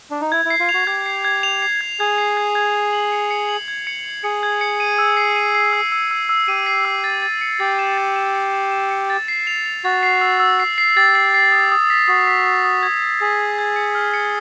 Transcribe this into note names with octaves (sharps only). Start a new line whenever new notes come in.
D4
D#4
E4 G#6
E4
C7
F4
F7
F#4
G4 G#6
C7
G#6
F7
C7
G#6
G#4 G#6
C7
G#6
G#6
G#6
F#7
C#7
C#7
F#7
G#6
C#7
F#7
G#4 C#7
G#6
C#7
D#7
E6
C7
D#7
C7
E6
E6
E6
E6
G4 D#7
C7
E6
A6
A6
C#7
G4 A6
E7
A6
E7
C#7
E7
E7
C#7
A6
C7
F7
F7
F#4 A6
C7
E6
E6
C7
C7
G4 A6
C7
C7
D#6
D#6
B6
F#4 D#6
B6
D#6
D#6
G#6
D#6
G#4 B6
D#6
G#6
C#7
F6
C#7